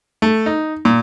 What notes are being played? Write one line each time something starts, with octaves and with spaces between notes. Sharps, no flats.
A3
D#4
A#2